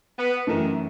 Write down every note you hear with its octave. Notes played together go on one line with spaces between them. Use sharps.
B3
F#2 D#3 E3 A3